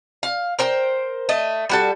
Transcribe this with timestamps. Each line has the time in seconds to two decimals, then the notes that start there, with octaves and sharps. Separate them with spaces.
0.23 F5
0.59 A#4 C5 G5
1.29 A3 D#5
1.69 G3 F#4 A4